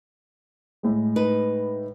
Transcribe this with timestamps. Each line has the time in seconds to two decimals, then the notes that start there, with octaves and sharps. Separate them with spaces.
0.83 A2 G#3
1.16 D#4 B4